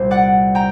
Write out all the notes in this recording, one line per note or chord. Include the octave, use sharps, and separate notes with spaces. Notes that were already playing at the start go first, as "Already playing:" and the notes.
Already playing: C2 A#2 G3 C5
D5 F#5
G5 A#5